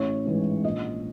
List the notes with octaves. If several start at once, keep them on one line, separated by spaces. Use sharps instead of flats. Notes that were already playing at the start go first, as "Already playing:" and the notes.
Already playing: A1 C#5
G#2 E3 G#3
A#1 D#5